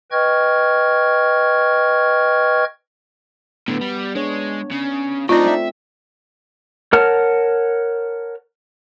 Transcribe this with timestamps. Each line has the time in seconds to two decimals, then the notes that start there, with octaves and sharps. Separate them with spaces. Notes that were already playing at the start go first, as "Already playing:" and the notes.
0.11 B4 D#5 G5 C#6 F6 G#6
3.68 A2 D3 B3
3.81 G3
4.15 G#3 D4 C#5
4.71 C#3
5.29 F#3 A3 C4 D4 D#4 F4 D5 D#5
5.47 E5
6.93 A#4 C#5 F#5 A5 F6